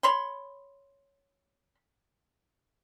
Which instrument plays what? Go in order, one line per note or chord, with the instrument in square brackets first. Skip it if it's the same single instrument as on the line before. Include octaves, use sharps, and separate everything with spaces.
[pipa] C#5 B5 C6